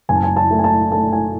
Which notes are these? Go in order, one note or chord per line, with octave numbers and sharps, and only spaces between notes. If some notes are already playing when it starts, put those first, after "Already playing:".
F#1 G#5
A5
G#5
A5
A3
G#5
A5
A3 A5
G#5